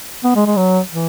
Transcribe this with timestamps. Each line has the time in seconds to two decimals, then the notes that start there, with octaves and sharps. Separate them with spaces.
0.24 B3
0.36 G#3
0.46 G#3
0.57 F#3
0.90 E3